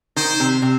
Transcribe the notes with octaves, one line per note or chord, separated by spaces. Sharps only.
D#3 C5
C3
C3